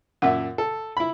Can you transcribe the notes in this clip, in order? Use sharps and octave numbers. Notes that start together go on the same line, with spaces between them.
F#2 A#2 E5 F#5
A4
E4 B5